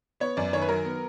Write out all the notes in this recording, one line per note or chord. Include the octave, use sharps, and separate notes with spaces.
B3 C#5
F#2 D5
D#3 C#5
B4
F#3 A#4
B3